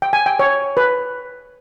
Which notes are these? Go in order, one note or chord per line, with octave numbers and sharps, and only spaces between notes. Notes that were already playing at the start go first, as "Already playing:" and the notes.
G5
G#5
G5
C#5
B4